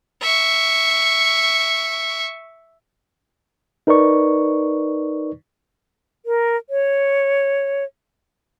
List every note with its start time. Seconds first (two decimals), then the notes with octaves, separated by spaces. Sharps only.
0.22 E5 C#6
3.87 D#4 A#4 B4 D5 C#6
6.26 A#4
6.70 C#5